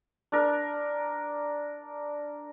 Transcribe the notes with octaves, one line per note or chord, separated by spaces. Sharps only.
D4 A#4